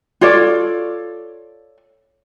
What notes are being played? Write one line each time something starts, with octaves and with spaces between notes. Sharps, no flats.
F4 A4 C#5 D5